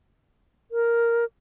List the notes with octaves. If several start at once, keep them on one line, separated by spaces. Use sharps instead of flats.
A#4